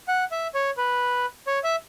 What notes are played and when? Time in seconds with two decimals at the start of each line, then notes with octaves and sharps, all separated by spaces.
0.08 F#5
0.31 E5
0.54 C#5
0.77 B4
1.47 C#5
1.64 E5